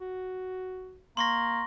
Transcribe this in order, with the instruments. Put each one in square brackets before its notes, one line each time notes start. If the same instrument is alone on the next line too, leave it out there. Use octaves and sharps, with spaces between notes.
[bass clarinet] F#4
[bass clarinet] A#3 [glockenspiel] C6 C#6 A#6